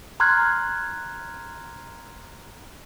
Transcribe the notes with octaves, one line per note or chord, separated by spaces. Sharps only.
A#5 C6 F6 F#6 G#6